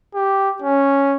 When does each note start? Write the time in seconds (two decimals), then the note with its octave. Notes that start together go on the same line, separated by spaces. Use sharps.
0.15 G4
0.62 C#4